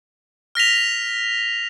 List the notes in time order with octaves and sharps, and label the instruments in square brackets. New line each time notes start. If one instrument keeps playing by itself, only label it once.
[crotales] F6 A#6 B6 F7